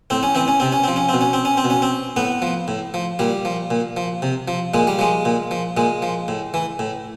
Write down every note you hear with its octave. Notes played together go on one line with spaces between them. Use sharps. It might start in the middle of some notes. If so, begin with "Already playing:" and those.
A2 C4
C#4
E3 C4
C#4
C3 C4
C#4
F3 C4
C#4
B2 C4
C#4
C4
C#4
C4
B2
C#4
C4
A2 B3
F3
A2
F3
A#2 G3
F3
A#2
F3
C3
F3
A#2 G#3
G3
F3 G#3
A#2
F3
A#2 G#3
F3
A2
E3
A2